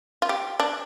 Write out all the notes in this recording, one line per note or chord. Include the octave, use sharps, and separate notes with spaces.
F4
G4
D4